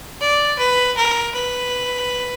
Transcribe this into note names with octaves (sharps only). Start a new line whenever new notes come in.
D5
B4
A#4
B4